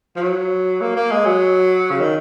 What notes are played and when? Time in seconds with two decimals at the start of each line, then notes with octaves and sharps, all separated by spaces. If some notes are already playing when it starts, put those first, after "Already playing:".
0.16 F3
0.22 F#3
0.81 A#3
0.96 A#3
1.11 G#3
1.26 F#3
1.90 C#3
2.00 D#3